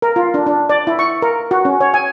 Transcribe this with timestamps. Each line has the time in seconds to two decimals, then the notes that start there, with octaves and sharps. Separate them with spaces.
0.02 A#4
0.16 F4
0.34 D4
0.46 D4
0.70 D5
0.87 E4
0.99 C#6
1.22 A#4
1.51 F#4
1.65 C#4
1.81 C#5
1.94 G#5